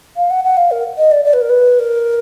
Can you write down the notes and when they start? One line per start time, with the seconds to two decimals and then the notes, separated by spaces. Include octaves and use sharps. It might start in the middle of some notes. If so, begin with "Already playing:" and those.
0.17 F5
0.30 F#5
0.44 F#5
0.57 F5
0.71 A#4
0.97 D#5
1.11 D5
1.24 D5
1.33 B4
1.41 A#4
1.49 B4
1.79 A#4